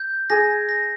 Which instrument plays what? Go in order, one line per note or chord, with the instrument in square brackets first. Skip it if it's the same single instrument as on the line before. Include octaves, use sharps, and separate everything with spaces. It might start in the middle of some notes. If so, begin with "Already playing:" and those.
Already playing: [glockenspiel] G6
[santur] G#4 [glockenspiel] A#6
[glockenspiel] A#6